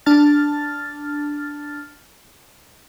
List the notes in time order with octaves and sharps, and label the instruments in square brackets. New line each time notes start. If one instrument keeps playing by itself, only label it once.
[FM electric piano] D4 A5 F6 A6